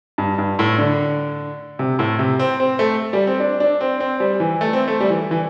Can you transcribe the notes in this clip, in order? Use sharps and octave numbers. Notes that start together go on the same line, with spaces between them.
G2
G2
A2
D3
C3
A2
C3
C4
C4
A3
G3
C4
D4
D4
C4
C4
G3
E3
A3
C4
A3
G3
E3
E3